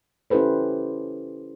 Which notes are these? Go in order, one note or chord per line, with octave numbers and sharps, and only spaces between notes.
C#4 E4 G4 A4 B4 C5